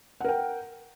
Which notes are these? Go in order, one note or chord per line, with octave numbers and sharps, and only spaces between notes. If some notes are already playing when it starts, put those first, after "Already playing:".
A#4 F#5 G5